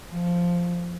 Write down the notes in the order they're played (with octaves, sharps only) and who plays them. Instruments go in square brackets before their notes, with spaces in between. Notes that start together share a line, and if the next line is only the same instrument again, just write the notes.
[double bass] F3